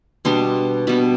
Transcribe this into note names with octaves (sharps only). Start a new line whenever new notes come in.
B2 G3 B3 D4 C6
B2 G3 B3 D4 B5